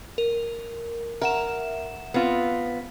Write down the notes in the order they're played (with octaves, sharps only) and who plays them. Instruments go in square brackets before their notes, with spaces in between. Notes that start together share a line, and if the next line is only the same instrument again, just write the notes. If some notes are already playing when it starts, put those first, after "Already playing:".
[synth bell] A#4
[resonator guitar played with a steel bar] A#4 [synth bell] E5 F#5 E7
[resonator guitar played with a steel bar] B3 C4 F4